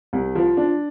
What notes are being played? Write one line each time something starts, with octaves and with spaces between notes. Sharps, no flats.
C2
F3
D4